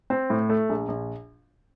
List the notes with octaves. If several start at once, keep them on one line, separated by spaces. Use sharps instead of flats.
C4
A2
A3
A#1
A#1